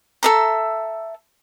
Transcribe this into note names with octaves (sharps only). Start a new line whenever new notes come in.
A4 E5 A#5